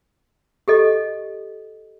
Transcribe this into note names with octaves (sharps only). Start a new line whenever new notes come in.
G4 A4 D#5